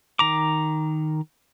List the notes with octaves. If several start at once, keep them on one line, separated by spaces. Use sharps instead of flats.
D#3 A#5 D6